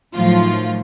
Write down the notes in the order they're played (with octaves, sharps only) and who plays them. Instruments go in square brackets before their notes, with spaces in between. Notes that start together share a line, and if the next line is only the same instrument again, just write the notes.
[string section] A2 D#3 F3 F#3 F4